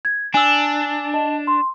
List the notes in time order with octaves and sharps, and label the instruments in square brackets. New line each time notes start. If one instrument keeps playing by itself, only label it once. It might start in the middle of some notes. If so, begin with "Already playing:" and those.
[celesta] G#6
[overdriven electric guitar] D4 [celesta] G#5 E6
[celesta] D#5 A5
C6